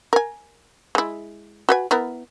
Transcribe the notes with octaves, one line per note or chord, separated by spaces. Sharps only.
A#4 G#5
G#3 E4
F#4 B4 G#5
B3 E4 A#4